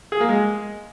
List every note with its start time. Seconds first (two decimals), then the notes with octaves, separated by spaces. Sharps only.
0.12 G#4
0.20 A#3
0.29 G#3